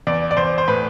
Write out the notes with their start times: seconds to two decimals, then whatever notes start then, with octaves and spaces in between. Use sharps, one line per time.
0.07 E2 D5
0.31 D5
0.37 E2 C5
0.58 C5
0.68 A2 B4